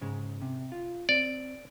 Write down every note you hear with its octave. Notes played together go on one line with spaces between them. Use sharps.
G#2 C#3 G#3
C3
F4
C4 D5